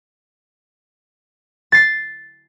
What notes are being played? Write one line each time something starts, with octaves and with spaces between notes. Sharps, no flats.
A6 C7